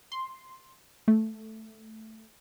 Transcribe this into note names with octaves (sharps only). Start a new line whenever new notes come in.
C6
A3